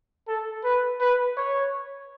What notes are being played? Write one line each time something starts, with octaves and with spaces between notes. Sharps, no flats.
A4
B4
B4
C#5